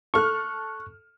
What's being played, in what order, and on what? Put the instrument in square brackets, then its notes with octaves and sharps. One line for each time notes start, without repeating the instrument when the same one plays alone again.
[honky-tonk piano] A4 F6 [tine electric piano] C#6 F#6